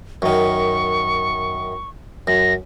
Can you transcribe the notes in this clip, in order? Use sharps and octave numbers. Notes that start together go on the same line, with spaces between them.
F#2 D#3 C#6
F#2 A#6